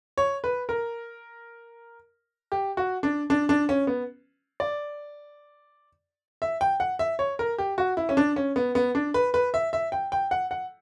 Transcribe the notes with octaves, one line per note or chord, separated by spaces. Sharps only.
C#5
B4
A#4
G4
F#4
D4
D4
D4
C#4
B3
D5
E5
G5
F#5
E5
C#5
A#4
G4
F#4
E4
C#4
D4
C#4
B3
B3
D4
B4
B4
E5
E5
G5
G5
F#5
F#5